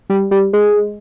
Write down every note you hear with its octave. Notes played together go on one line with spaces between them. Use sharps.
G3
G3
G#3